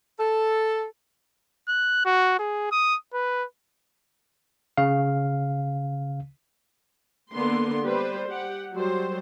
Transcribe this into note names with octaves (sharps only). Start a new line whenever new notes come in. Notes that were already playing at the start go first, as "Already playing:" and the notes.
A4
F#6
F#4
G#4
D#6
B4
C#3 F5
D3 A#3 B3 C6
G3 B4 C5
G4 F#5
F#3 G3 C5